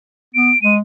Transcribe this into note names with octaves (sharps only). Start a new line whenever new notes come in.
B3 D7
G#3 D#7